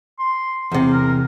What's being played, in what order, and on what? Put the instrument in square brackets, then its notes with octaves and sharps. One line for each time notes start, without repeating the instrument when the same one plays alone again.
[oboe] C6
[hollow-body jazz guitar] E2 C3
[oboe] A#4